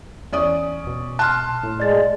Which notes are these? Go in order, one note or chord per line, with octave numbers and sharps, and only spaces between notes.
E2 C#4 D5 D#6
B2
A5 C6 F6 F#6
A2
G#3 D5 A6